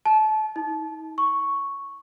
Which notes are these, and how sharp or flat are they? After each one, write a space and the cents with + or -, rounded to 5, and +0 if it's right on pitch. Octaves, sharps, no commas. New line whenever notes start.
A5 -30
D#4 +45
C#6 +0